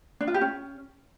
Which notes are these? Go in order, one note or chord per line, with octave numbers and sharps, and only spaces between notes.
D4
F4
G4
C#4